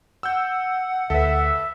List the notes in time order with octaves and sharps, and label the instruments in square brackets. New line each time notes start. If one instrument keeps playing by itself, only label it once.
[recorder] F#5 [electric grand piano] E6 G6
[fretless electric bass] D2 [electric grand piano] A4 B4 [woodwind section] E5